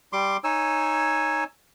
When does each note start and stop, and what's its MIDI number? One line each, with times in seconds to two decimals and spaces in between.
0.13 0.37 55
0.13 0.37 84
0.13 0.37 86
0.44 1.44 63
0.44 1.44 73
0.44 1.44 80
0.44 1.44 88